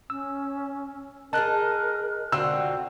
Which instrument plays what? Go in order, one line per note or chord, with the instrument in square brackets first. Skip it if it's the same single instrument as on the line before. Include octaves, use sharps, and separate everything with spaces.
[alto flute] C#4 [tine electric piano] E6
[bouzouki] D#4 G4 G#4 [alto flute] A#4 [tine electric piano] A5 F#6
[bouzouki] D3 C4 F4 [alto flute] F#4 [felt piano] E6